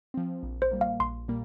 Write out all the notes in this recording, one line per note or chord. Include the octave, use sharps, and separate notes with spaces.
F3 C4
A#1
C5
A#2 G3 A#3
F5
A#1 C6
A#2 G3 A#3